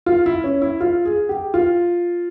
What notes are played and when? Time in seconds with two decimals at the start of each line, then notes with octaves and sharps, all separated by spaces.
0.06 F4
0.26 E4
0.44 C#4
0.62 E4
0.80 F4
1.05 G#4
1.29 G4
1.54 F4